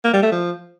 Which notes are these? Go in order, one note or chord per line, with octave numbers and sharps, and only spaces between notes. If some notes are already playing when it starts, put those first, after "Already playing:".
A#3
G3
A3
F3